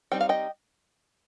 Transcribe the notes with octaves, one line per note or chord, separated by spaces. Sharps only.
G3 C4 D#4 G5
F5
D#5 G5